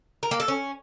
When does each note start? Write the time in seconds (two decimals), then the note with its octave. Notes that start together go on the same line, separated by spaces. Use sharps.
0.23 A#4
0.31 A#3
0.40 A4
0.48 C#4